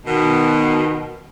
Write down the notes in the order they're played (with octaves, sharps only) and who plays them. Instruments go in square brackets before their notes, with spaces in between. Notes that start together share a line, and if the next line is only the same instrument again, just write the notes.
[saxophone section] B2 D#3